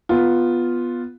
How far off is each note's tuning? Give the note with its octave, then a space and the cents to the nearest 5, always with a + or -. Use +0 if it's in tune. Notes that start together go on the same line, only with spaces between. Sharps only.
B3 +0 F4 +0